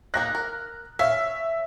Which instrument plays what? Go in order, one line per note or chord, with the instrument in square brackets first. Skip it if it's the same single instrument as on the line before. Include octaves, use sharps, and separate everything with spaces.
[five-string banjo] G#3 A#3 D#4 [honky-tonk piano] F#6 A#6
[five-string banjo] A#4
[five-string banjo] C#4 F5 [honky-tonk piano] E5